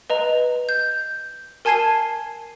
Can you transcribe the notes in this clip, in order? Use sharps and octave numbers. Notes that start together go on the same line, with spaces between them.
B4 D#5 A#5
G6
A#4 G#5 A5 G#6 C7 D#7